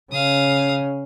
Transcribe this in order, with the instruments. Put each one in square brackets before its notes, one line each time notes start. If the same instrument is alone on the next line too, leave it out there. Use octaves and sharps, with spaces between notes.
[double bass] C#3 [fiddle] F5 D#6